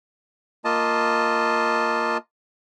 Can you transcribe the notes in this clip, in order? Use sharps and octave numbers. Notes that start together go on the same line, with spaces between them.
A#3 F4 D#5 A5